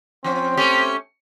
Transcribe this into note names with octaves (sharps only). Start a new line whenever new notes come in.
F3 C4 C#4
A3 C#4 G4